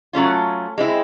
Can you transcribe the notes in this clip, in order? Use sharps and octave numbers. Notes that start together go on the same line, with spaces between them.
F#3 A3 C#4 F4
G#3 C4 E4